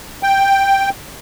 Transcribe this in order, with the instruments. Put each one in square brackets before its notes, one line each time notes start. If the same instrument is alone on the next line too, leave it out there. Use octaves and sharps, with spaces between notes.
[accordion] G5